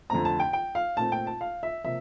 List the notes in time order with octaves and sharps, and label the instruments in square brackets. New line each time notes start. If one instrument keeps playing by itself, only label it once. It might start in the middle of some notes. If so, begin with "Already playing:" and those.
[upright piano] F2 D3 A3 C4 A#5
A5
G5
G5
F5
A#2 A3 C4 A5
G5
A5
F5
E5
C3 F3 A#3 E5